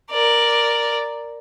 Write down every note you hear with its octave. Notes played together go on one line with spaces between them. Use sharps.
A#4 D5